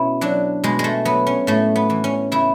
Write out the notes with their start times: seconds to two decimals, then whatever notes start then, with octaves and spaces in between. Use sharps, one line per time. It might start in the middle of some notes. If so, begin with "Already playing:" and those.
Already playing: B2 C#4 E4
0.21 F#3 D4
0.64 B2 G#3
0.79 G#3
0.84 A3
1.05 F#3 B3
1.27 C#4
1.47 A2 A3
1.76 B3
1.90 E3
2.04 C#4
2.32 C#3 E4